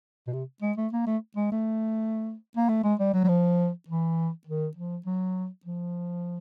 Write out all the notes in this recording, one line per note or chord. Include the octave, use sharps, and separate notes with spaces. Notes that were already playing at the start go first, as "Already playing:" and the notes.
B2
C3
G#3
A3
A#3
A3
G#3
A3
A#3
A3
G#3
G3
F#3
F#3
F3
E3
D#3
F3
F#3
F3